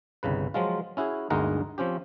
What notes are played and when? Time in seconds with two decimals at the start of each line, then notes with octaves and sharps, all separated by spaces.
0.23 G1 C2 C#3 B4
0.54 F3 F#3 G#3 F4
0.97 C#4 E4 F#4 G#4
1.30 G1 D2 G#3 D#4 A#4 F#5
1.78 F3 C4 C#4 G4